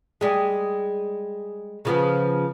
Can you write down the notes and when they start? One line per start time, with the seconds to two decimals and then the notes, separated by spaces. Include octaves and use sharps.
0.21 G3 G#3
1.85 C#3 F3 B3